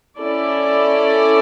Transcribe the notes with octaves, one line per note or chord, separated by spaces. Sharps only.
C#4 E4 A4 D5